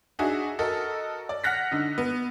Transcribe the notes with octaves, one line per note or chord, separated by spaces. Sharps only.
D4 D#4 F#4 G#4 E5
F#4 A4 A#4 D#5
D5
F#5 F6 F#6 A#6 B6
D3 D#4
B3